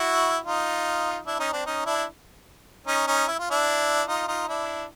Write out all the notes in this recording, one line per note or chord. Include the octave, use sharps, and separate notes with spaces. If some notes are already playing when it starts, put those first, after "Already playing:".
Already playing: E4 F#4
D#4 F4
D4 E4
C#4 D#4
C4 D4
C#4 D#4
D4 E4
C#4 D#4
C#4 D#4
E4
F4
D4 E4
D#4 F4
D#4 F4
D4 E4